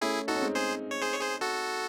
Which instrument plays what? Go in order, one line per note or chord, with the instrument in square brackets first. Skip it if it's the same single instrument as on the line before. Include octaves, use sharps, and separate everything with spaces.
[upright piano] A3 C#4 [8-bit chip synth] E4 G#4
[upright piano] D#4 [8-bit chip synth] F#4 A4
[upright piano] C#4
G#3 C4
[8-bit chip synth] G#4 C5
C#5
G#4 C5
C#5
G#4 C5
F#4 A4